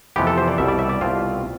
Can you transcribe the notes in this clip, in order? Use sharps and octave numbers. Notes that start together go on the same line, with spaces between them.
F2 C3 E3 B3 G4
A4
C5
D5
C2 B2 G3 E5
D5
E5
D5
C2 B2 A3 C4 F4